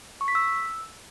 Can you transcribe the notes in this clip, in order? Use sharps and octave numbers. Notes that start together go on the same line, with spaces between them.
C#6
B6
E6